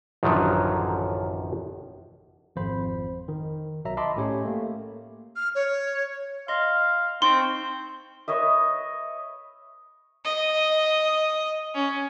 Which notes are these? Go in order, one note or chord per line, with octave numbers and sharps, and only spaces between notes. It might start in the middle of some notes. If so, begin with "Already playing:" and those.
A1 F#2 D3 D#3 F3 F#3
G#1 F2 C5 B5
D#3
B1 F#3 E5 A#5
D#5 E5 A5 B5 C6 D6
A2 A3 C#4 G4 C#5
A3 A#3
F6
C#5
D#5 F5 C6
C4 D#4 C6 C#6 G6
B4 C#5 D#5 E5
D#5
C#4